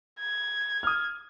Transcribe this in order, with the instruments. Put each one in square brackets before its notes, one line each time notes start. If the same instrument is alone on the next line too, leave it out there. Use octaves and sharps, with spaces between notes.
[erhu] G#6
[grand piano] D#6 F6